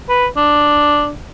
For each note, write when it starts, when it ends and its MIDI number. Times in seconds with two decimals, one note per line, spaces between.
0.09 0.27 71
0.37 1.10 62